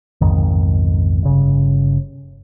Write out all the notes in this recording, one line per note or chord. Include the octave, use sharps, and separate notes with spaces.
B1 F2 G#2 D#3
G1 C#3